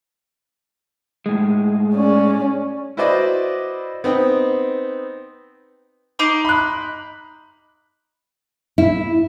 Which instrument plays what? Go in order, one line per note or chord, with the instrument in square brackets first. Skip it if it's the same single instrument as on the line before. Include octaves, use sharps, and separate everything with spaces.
[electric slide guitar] A2 G#3
[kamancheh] C#4 D5
[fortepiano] E4 F#4 B4 C5 D5 D#5
B3 C4 D#4 G5
[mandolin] D#4 C6 D6
[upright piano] B5 F#6
[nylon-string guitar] E4